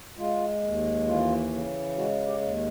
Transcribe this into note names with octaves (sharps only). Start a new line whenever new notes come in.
G#3 F4
D#2
E3 F4
C#3
G#3 F#4
G4
D#2